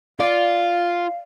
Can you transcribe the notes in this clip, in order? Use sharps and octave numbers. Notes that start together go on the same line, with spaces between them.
F4 D5 F5